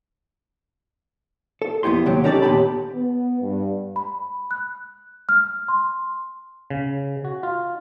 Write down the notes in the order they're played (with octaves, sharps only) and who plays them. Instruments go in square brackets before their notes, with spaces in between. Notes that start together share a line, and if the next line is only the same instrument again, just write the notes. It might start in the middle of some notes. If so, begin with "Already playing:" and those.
[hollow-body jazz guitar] A4
F2 B3 E4 G4 C6
D#2 C3 F#3 G4
C#4 D#4 G4 A4 B4 D5
D#2 A#2 B3 G4 A5 B5
[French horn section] B3
G2
[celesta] B5
F#6
F6
C6
[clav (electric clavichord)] C#3
F#4
F4